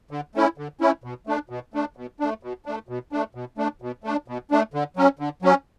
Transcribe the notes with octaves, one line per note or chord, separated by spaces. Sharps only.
D3
A3 C#4 E4
D3
A3 C#4 E4
B2
A3 D4
B2
A3 D4
B2
A3 D4
B2
A3 D4
B2
A3 D4
B2
A3 D4
B2
A3 D4
B2
A3 D4
D3
F#3 C#4
D3
F#3 C#4